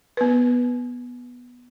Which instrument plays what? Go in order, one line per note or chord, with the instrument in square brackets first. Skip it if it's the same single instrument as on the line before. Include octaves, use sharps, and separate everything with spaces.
[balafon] B3 B4